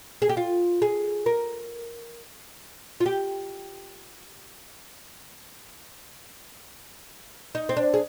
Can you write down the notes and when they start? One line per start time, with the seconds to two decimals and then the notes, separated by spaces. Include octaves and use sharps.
0.22 G#4
0.29 G4
0.37 F4
0.82 G#4
1.26 A#4
3.00 F4
3.06 G4
7.55 D#4
7.69 C4
7.77 D4
7.94 G#4